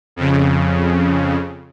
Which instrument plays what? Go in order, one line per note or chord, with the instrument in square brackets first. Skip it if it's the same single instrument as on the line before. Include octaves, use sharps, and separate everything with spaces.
[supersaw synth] F2 C#3